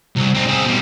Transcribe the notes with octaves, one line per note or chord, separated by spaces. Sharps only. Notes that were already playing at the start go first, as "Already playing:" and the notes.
C2
C4 D#4
C4 G#4
B2 G3